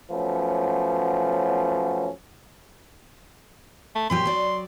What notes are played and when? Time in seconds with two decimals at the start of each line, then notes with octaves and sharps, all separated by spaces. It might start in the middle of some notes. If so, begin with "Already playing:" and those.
0.11 F3 F#3 A3 B3 C#4
3.96 A3
4.10 A#2 F#3 G4 C6
4.26 F#3 D5